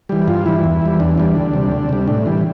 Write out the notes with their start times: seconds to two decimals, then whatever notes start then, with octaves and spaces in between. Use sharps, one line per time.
0.09 E3 G3
0.27 G2 F4
0.46 E3 G3 E4
0.64 E2
0.82 E3 G3
1.00 E2 D4
1.18 E3 G3 D4
1.36 D2
1.54 C3 G3
1.71 D2
1.89 C3 G3
2.08 A2 D4
2.26 E3 G3